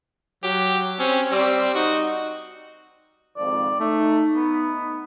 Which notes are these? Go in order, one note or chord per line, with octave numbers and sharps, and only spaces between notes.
F#3 G4
C4 C#4
G3 C4
D#4 F#4
G#1 F2 D5
A3 D#4
B3